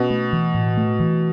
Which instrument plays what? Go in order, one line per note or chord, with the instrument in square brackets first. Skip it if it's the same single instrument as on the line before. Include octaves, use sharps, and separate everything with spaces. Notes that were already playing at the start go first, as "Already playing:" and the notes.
Already playing: [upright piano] B2 [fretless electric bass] C#4
[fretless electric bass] A3
E3
A2
A3
E3